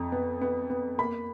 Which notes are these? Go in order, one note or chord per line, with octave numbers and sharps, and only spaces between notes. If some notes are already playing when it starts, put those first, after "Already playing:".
Already playing: F2 A#5
B3
B3
B3
A#3 B5